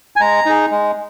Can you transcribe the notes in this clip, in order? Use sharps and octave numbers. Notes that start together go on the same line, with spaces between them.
G#5
G#3 A#5
D#4 G#4
G#3